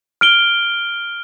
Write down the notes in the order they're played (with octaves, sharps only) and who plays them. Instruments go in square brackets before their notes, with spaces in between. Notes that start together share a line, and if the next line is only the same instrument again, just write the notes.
[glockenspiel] F6 D7 G7